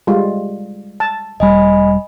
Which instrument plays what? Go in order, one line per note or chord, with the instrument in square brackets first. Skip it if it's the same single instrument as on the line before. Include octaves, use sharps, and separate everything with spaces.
[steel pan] G3 G#3 F4
A5
[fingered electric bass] E1 G3 [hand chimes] D#5 G#5 B5